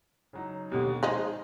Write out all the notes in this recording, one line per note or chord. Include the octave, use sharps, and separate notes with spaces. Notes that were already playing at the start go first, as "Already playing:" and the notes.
C#3 F#3 D#4
D#2 B2 D3 G4
F3 G#3 C4 D#4 G#4 D#5